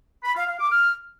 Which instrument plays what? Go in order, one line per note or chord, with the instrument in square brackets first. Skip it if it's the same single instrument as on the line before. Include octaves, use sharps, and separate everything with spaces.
[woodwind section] B5
F5
F5
D6
F6